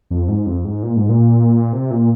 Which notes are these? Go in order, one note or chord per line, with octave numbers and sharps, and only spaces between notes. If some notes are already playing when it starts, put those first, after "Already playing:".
F2
G#2
F2
G#2
A#2
G#2
A#2
C3
A#2